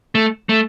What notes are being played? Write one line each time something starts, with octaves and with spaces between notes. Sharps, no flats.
A3
A3